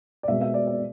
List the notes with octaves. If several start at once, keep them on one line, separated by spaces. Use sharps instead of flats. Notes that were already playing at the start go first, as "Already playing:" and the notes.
D5
B2 G#3 C4 E5
E5
D5
D5